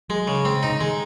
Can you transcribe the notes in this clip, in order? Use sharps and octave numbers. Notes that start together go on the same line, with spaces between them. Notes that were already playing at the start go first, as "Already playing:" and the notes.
F#3 G#3
C#3
G#3 C4
C3 D#4
C#3
D#3 G#3